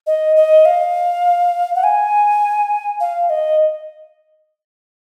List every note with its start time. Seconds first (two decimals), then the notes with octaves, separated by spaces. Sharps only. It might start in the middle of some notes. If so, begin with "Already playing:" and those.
0.07 D#5
0.36 D#5
0.65 F5
1.75 F#5
1.83 G#5
3.00 F5
3.30 D#5